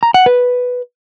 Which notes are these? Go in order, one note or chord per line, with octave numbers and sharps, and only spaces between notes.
A#5
F#5
B4